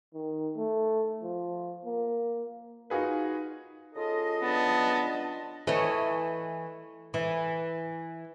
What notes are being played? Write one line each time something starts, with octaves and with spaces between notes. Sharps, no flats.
D#3
A3
F3
A#3
D#4 F4 F#4 G#4 B4
C#3 F4 A4 D#5
B3 D4 A5
E3 A3 C#5 D#5
E3